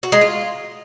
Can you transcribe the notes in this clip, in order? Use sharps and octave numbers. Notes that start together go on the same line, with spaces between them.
F#4
G#3
F4